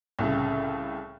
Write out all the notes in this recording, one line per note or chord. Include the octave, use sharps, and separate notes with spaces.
C2 A2 C#3